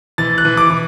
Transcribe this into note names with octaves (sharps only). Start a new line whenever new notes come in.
E3 A6
F#6
E3
D6
E3